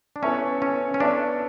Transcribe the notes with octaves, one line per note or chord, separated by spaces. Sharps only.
D4
B3 C#4 E4 A4 C#5 E5
C#4
C#4
B3 D4 E4 A4 C#5 E5